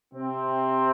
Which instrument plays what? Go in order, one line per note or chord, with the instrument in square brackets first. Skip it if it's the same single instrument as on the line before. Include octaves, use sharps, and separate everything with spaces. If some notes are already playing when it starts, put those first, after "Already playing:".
[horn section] C3 C4